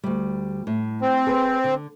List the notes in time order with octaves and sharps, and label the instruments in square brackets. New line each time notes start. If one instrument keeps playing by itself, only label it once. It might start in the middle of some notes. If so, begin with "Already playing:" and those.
[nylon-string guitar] D2 G3
A2
[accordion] C4
[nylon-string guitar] G#4 B4
D3